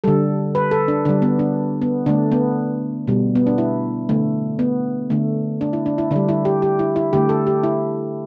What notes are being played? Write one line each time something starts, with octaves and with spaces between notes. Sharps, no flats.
D3 G3 A4
B4
A4
D4
D3 G3 D4
B3
D4
B3
D3 A3 D4
B3
B2 G3
B3
D4
E4
D3 A3
B3
D3 A3
D4
E4
D4
E4
D3 G3 D4
E4
G4
G4
E4
E4
D3 A3 G4
A4
G4
E4